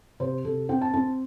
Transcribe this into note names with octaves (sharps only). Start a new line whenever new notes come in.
C3 C5
C3 A4
C4 G5
A5
C4 A5